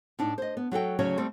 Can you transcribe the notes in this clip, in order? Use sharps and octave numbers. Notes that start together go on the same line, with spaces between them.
A2 D4 D#4
C5 D#5
B3
F#3 F#4 A4 G5
D2 C#3 F#3 C#4 C#5
G3 A3 C4